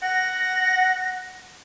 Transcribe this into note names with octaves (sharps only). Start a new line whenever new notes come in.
F#5 A#6